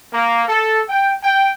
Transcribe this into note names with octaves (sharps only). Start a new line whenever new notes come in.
A#3
A4
G5
G5